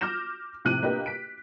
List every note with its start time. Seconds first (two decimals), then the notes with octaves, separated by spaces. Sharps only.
0.01 D6 F6 G6 A#6 E7
0.65 A2 C3 F3 F#6 D#7
0.83 A#3 D4 G4 B4 D#5 G5
1.06 B6 D7